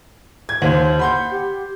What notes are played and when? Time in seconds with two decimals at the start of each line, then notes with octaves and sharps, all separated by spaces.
0.49 G#6
0.62 D#2 C5
0.99 F#5 B5 C6 G6
1.31 G4